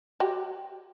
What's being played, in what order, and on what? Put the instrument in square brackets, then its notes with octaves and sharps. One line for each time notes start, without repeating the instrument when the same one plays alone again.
[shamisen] F#4 G4